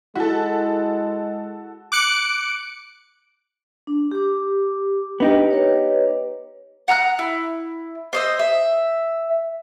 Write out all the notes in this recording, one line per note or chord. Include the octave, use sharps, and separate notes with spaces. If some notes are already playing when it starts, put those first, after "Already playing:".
G#3 E4 F#4 A4
D6 F#6 C#7 D7
D4
G4 D6
B3 D4 D#4 G4
B4 C#5
F#5 A#5 E6 F#6
E4
C5 D#5 E6
E5